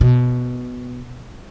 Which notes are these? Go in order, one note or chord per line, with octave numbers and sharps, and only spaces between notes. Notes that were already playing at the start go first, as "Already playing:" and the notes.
B2